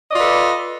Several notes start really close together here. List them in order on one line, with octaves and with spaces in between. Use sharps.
D#5 D5 F4 B4 A4